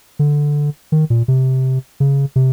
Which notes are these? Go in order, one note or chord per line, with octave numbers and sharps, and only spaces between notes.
D3
D#3
A#2
C3
C#3
C3